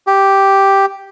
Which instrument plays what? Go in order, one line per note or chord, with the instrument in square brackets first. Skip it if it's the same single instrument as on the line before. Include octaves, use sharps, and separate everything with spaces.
[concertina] G4